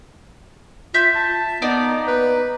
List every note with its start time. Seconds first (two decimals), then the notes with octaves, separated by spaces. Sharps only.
0.94 F4 E5 G6
1.15 A5
1.62 A#3 B3 D#4 D5
2.07 B4